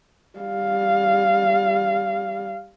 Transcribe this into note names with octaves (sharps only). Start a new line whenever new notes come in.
G3 F5